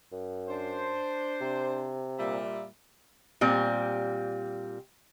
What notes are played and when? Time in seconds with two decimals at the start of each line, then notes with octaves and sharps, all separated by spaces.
0.12 F#2
0.49 D4 C5
1.41 C3
2.18 A#2 G3 E5
3.41 A#2 G3 C4